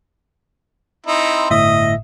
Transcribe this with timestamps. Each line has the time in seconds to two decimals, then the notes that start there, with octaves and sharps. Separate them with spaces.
1.06 C4 D#4 E4
1.51 G1 A2 D#5 E5 D#6